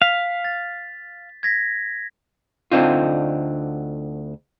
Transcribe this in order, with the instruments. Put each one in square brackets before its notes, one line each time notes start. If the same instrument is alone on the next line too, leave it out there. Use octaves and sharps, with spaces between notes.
[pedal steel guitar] F5 [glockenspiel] B6
[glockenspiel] A6
G#6 A#6 B6
[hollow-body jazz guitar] D2 D3 C4 D#4 F4